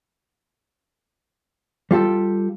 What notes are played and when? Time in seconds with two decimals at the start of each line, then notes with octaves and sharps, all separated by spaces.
1.91 G3 F4 G4 A4